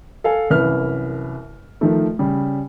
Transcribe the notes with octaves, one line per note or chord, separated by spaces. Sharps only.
A4 F5 G#5
C2 F#2 E3 B4 F6
D#3 F3 A3
C#3 G3